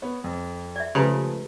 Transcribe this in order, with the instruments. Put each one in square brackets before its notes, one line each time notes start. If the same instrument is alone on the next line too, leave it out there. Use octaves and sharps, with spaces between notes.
[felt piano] B3 C#5
F2
[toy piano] D5 E5
[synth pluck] C#3 [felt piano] F3 G#3 A3 [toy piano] G4 B4 A#5